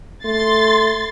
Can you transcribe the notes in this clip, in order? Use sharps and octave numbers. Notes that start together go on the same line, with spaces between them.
A3 C6 A6